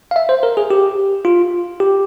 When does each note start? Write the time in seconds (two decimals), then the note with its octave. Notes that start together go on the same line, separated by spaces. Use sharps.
0.11 F5
0.16 E5
0.29 C5
0.43 A#4
0.57 G#4
0.70 G4
1.25 F4
1.80 G4